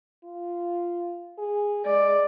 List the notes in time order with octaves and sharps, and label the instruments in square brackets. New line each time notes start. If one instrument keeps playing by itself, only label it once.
[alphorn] F4
G#4
[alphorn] G#3 [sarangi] D5